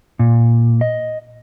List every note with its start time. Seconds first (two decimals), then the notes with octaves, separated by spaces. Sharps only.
0.19 A#2
0.81 D#5